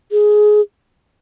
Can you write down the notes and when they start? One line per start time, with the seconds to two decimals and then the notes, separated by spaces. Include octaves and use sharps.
0.12 G#4